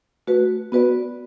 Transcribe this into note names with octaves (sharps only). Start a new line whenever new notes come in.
A3 F#4 B4
B3 F#4 B4 D5